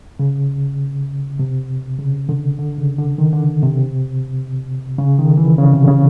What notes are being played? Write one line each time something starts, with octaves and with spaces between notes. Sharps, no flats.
C#3
C3
C#3
D3
D3
C#3
D3
D#3
D3
C3
C#3
D#3
E3
C#3
C3
C#3